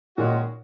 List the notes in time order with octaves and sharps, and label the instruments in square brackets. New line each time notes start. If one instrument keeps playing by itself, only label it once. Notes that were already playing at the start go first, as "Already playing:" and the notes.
[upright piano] A#2 [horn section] D#3 G#3 C#4 F#4